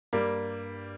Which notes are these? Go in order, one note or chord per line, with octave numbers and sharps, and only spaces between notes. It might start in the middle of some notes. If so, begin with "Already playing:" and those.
G2 G3 A#3